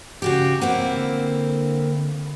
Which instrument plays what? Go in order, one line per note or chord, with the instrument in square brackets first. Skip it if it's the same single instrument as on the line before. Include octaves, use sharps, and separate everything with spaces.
[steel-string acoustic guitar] C#3 F#4 G4
[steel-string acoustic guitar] A#3 C4 E4 [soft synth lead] F#5
[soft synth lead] D3